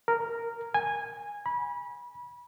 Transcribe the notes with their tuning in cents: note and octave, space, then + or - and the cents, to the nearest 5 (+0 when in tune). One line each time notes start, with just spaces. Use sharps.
A#4 -5
G#5 -15
B5 -25